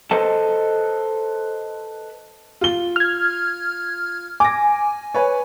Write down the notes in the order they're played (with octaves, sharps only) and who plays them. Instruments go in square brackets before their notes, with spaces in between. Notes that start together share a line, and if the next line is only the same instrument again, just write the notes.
[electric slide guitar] A4 B4 C5 D#5 A5
[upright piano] F4 G7
[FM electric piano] F6 G#6
[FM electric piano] G#5 [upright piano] D6 A#6
[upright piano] B4 C#5